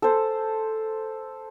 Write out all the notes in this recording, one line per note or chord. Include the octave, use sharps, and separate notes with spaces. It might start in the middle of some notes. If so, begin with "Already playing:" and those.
A4 C5